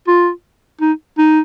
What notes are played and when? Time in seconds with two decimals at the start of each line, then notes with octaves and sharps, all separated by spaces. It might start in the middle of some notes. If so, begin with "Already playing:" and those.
0.07 F4
0.81 D#4
1.18 D#4